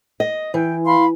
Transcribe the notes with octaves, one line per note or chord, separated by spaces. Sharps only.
D#5
E3 G5
F5 B5 C6